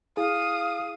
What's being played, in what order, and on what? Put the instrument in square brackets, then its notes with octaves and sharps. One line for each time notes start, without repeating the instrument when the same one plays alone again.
[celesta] E4 [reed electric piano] G#4 [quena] F5 [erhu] D#6